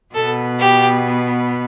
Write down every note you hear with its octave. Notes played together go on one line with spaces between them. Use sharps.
B2 B3 A4
G4